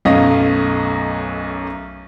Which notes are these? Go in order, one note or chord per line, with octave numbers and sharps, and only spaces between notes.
B1 F#2 A3 D#5 F5